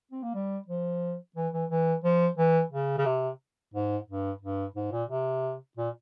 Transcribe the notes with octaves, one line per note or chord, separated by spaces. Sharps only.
C4
A#3
G3
F3
E3
E3
E3
F3
E3
C#3
C#3
C3
G#2
G2
G2
G#2
A#2
C3
A#2